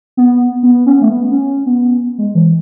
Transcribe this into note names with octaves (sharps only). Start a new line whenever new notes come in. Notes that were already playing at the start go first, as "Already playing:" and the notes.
B3
B3
C#4
A3
B3
C#4
B3
G#3
E3